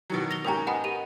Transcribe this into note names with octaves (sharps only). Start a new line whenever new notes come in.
B2 D#3 F#3
A#6 F7 G7
G#2 C#4 G4 A#4 A#5
B3 D#5 F#5 G#5 B5
G4 A#4 F7